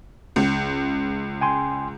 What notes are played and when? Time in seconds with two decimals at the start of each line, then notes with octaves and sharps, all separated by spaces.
0.36 C#2
1.41 G5 G#5 C6